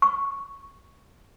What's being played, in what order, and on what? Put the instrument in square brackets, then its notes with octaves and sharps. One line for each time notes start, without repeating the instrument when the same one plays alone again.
[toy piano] C#6